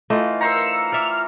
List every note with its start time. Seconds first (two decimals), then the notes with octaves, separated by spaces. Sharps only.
0.10 E3 A3 D#4 F4 D#5
0.41 A#4 C5 A#5 E6 C#7
0.92 D5 E5 F6